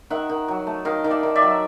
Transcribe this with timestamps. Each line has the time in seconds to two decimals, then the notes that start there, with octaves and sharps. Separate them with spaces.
0.10 D#3 E5 F#5
0.29 D#3
0.48 F#3
0.67 A3
0.85 D#3 D#5 F5
1.04 D#3
1.10 D5 E5
1.23 D#3
1.36 D5 E5
1.42 F#3